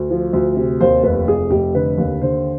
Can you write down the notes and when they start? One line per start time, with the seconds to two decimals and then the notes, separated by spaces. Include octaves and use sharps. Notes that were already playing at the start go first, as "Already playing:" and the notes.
Already playing: D2
0.10 F3
0.33 D2
0.56 C3
0.80 D#2 C5
1.04 F1 B4
1.27 F1 G#4
1.50 F1 G4
1.74 D3 B4
1.98 D#2
2.21 D3 C5